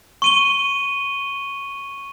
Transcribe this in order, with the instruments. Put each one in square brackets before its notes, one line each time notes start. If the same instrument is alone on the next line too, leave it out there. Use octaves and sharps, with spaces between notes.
[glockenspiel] C#6 D#7 G7